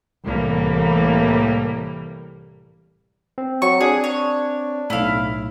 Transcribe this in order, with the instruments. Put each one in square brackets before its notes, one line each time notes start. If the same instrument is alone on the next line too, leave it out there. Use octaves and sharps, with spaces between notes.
[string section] C2 A2 E3 G3 A#3
[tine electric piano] C4
[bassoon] F#3 [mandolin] C#6
[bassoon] D4 [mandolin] G#4
[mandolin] C#5
[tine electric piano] B1 A2 [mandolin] E4 F5